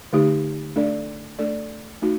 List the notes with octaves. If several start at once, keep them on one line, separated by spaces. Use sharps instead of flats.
D3 A3 D#4 G4
A3 D4 A4 D5
A3 D4 A4 D5
A3 D#4 F#4